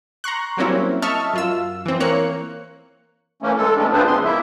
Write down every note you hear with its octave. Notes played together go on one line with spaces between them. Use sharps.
A#5 C6 C#6 F#6
F#3 G3 A#3 C4 C#4 E4
D#5 E5 A5 C#6 E6 F6
F#2 F4 E6
E3 C4
A#3 C#5 F#6 C#7
E3 A3 A#3 C#4
G#3 A4
F#2 E3 A3 B3 C#4 D4
C4 D4 F4 G#4 B4 C5
F2 C#3 G#3 B3 C6
A#3 E4 E5